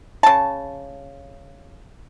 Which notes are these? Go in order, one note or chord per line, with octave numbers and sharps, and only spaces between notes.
C#3 A5